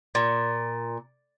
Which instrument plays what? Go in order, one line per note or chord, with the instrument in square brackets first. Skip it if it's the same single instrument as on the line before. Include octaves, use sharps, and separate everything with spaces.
[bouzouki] A#2